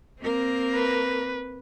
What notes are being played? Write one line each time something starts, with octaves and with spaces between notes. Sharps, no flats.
A#3 C4 A#4
B4